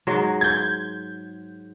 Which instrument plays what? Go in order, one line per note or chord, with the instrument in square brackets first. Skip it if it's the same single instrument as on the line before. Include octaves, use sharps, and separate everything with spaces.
[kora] G#2 F#3 G#3
[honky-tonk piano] G6 G#6